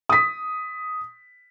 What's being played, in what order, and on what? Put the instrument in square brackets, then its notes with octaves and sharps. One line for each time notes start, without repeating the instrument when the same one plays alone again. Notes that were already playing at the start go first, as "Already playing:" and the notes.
[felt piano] D#6 B6